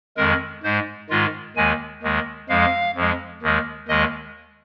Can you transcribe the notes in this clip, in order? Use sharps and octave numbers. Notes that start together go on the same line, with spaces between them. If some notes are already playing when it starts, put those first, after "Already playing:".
F2 D#3 G#3 A#4
G#2 G#3 C5
G#2 D#3 G#3 F4
D#2 D#3 G#3 G#5
D#2 D#3 G#3
F2 F3 G#3 F5
F2 F3 G#3
D#2 D#3 G#3
D#2 D#3 G#3 D#5